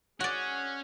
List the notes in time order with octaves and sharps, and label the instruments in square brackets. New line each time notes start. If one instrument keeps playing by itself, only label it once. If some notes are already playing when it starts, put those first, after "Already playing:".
[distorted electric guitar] C#4 [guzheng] F#4 D5 [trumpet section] G#4 F#5